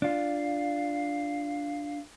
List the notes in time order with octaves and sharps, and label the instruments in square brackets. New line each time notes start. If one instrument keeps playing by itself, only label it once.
[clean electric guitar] D4 F4 [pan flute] F5